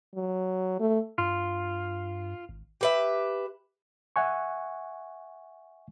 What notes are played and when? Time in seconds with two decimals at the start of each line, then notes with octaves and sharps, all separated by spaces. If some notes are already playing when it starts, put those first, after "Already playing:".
0.15 F#3
0.80 A3
1.18 G2 F4
2.49 G#1
2.81 G4 B4 E5
4.16 E5 F#5 G#5 C#6